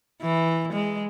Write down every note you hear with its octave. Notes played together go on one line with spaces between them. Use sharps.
E3
G#3